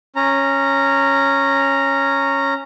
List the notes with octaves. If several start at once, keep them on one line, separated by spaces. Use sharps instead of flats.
C#4 A#5